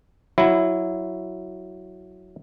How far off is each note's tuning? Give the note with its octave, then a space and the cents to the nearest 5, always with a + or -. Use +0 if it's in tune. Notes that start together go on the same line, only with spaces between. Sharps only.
F#3 +0 E4 +0